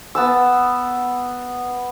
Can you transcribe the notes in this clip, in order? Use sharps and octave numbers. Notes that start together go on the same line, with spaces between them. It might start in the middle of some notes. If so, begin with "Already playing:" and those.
B3 A5 E6